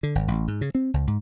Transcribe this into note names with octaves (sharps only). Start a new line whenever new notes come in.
D3
G#1
A1
G#2
C#3
C4
C#2
G#2